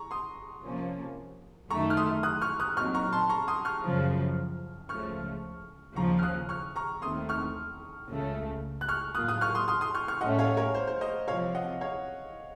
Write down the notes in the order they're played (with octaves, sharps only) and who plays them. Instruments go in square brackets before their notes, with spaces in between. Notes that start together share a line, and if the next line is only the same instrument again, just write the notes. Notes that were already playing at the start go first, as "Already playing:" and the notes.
Already playing: [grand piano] A#5 C#6
C6 D#6
[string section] C3 F3 A#3 C#4
[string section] F#2 D#3 A3 [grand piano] A#5 C#6
[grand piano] F6
C6 D#6
D#6 F#6
C#6 F6
D#6 F#6
[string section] A#2 F#3 C4 D#4 [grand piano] C#6 F6
[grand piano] A#5 C#6
A5 C6
A#5 C#6
C6 D#6
C#6 F6
[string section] F#2 C#3 F3
[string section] C#2 C#3 F3 A3 [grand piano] C#6 F6
[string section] D#2 C#3 F3 [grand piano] A#5 C#6
[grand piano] F6
D#6 F#6
C#6 F6
A#5 C#6
[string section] D#2 D#3 A3 C4 [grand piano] C6 D#6
[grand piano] C#6 F6
[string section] C#2 C#3 A3
[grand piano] F#6
C#6 F6
[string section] A2 F#3 A#3 F4 [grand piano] D#6 F#6
[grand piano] D#6 F#6
C#6 F6
C6 D#6
C6 D#6
C6 D#6
C#6 F6
C#6 F6
[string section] A2 A3 C#4 [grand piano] D#5 F#5
[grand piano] C#5 F5
A#4 C#5
C5
C5
C5 D#5
[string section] C3 F3 C4 [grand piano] C#5 F5
[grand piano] D#5 F#5
C#5 F5